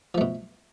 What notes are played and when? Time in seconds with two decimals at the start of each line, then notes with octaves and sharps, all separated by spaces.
0.15 F3
0.18 A3
0.21 B2